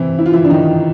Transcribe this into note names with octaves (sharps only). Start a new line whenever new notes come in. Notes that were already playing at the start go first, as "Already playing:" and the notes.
Already playing: C3 E3 C4 E4
E4
F4
E3 E4
D4
D#3 D#4